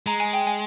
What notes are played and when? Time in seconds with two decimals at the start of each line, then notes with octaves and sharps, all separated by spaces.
0.07 G#3 A#5
0.20 G#5
0.33 G5
0.47 G#5